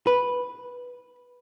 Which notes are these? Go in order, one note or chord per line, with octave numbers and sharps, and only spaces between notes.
B4